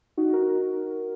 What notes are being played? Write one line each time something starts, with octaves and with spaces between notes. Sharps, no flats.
D#4 F#4
F#4 A#4
D#4 F#4